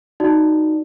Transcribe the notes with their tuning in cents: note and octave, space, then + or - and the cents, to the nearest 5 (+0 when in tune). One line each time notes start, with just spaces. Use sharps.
D#4 +0 F#4 +0 D5 +0